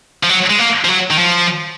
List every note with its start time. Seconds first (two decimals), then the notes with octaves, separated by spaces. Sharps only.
0.23 F3
0.29 F#3
0.50 G#3
0.59 A#3
0.84 F3
0.88 F#3
1.10 D#3
1.18 F3